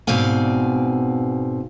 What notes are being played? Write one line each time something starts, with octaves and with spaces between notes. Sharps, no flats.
G#2 B2 C4 D5 F5 G#5